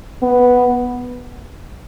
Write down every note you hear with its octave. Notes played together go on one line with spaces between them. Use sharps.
B3